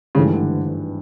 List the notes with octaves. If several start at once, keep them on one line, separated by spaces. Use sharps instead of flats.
G#1 G2 C#3 E3 A3
D3